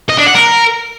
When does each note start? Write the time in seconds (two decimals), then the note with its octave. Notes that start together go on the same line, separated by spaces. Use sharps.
0.10 D#5
0.18 D4
0.26 F#5
0.35 A#4